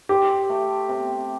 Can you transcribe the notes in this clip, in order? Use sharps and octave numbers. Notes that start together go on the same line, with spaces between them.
G4 C5
A3
C3